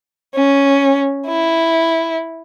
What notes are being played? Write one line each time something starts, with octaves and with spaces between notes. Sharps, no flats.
C#4
E4